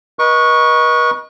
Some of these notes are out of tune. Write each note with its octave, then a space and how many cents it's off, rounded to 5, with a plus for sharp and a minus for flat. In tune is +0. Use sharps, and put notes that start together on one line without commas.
B4 -40 D#5 +0 C#6 +0